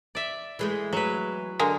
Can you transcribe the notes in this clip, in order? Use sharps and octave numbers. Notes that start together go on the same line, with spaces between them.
D5 E5
E3 G#3 A3
F#3 B4
D3 G#3 A#3